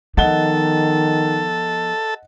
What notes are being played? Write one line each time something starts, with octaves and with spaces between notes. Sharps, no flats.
D#3 F3 B3 A4 D#5 F#5 G7